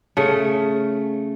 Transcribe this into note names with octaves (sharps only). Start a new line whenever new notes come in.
C#3 A3